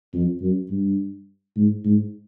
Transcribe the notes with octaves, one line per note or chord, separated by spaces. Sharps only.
F2
F#2
G2
G#2
G#2